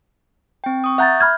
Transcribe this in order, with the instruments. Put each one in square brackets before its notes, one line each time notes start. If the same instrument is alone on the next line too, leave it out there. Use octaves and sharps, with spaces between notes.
[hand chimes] C4 G5
C#6 D#6
[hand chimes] E5 F#6 G6 [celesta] F#5 A#5 A6
[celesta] B5 F6 G#6